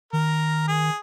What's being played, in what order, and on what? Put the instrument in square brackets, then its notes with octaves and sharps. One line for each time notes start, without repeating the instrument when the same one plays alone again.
[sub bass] D#3 [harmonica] A#4
[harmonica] G#4